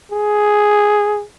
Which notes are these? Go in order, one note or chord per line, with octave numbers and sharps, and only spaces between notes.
G#4